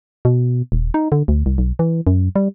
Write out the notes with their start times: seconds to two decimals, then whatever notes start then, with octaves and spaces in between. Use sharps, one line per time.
0.25 B2
0.72 D#1
0.94 D#4
1.12 D3
1.28 D2
1.46 C2
1.58 B1
1.79 E3
2.07 F#2
2.36 G3